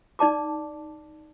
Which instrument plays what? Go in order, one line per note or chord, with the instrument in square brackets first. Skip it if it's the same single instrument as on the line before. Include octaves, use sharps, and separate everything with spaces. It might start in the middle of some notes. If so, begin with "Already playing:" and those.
[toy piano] D#4 D5 A5 D6